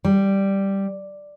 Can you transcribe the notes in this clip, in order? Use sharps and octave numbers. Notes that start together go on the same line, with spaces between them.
G3